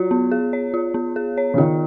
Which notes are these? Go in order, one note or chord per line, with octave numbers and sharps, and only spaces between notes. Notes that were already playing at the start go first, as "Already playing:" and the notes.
Already playing: F#3 F4 C#5
B3
G#4
C#5
F4
B3
G#4
C#5
C#3
D#3 F4